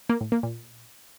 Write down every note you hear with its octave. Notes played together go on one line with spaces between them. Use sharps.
A#3
A2
A#3
A#2